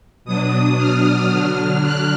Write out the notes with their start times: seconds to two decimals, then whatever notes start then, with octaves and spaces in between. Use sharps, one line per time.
0.25 B2 F#3 D4 D#6
0.78 F6
1.30 D3 F#3 D4 F6
1.83 F#6